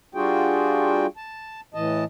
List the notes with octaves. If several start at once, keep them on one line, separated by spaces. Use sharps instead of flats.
G3 D4 F4 F#4 G#4 G5
A5
A2 E3 D#5 A5